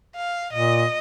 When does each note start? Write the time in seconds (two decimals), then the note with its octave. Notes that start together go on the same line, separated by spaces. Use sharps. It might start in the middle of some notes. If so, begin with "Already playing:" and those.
0.16 F5
0.53 A#2 D#5